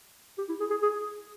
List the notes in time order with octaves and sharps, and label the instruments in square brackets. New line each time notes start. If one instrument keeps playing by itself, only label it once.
[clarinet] G4
E4
G#4
G#4
G#4